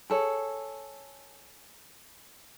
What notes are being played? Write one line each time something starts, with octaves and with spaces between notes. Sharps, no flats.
G#4 A4 C#5